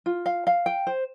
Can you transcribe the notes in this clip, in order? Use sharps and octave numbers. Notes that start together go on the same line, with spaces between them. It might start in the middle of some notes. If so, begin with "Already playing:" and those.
F4
F5
F5
G5
C5